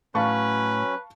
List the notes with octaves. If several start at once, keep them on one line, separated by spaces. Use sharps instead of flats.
A2 F#3 C#4 B4 F5 A5 C#6